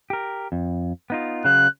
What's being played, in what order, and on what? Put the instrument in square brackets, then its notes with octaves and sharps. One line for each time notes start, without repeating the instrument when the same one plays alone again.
[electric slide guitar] G4 A#4
F2
B3 D#4 F4
[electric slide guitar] C#3 F#3 F5 [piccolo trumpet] F#6